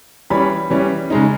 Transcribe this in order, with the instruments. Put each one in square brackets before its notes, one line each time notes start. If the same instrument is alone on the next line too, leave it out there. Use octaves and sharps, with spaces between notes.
[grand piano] E3 G3 C#4 B5
E3 G3 C#4
C#3 G#3 D#4